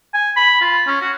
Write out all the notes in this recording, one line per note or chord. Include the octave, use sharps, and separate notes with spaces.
G#5
B5
F4
C#4
F#4